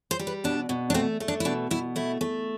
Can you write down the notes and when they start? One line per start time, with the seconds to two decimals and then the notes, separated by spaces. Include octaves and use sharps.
0.11 C5
0.19 G3
0.27 B4
0.44 B2 D4
0.69 B2
0.90 D4
0.94 A3 C4
1.20 A3
1.28 D4
1.40 E4
1.45 B2 D4
1.71 B2 E4
1.96 A3 E4
2.21 A3